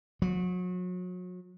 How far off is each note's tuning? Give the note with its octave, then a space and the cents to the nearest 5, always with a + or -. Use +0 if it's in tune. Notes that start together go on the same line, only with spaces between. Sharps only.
F#3 -35